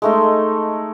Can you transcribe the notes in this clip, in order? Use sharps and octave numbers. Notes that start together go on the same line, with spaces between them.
G#3 A3 D#4